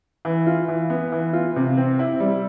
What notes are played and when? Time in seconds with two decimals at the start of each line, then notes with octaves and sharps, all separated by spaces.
0.25 E3
0.47 F4
0.68 E3
0.90 B3
1.12 E3
1.33 F4
1.56 C3
1.77 C4
1.99 E4
2.20 G3